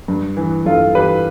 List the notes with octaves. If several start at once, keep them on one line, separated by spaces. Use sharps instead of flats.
G2
E3
G2 F4 A4
E3 G4 B4